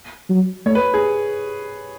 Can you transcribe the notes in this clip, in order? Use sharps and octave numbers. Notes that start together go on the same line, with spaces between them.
F#3
A3 C#5
B4
G#4